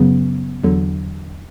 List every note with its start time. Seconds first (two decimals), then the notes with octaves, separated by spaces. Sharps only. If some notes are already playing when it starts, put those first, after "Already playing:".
Already playing: F#2 C#3 F#3 B3
0.64 E2 D3 F#3